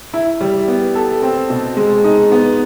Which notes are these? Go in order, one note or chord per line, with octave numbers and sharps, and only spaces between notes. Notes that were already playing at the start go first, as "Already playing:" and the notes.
E4
G3
B3
A4
C4
B2
G#3
D#4
B3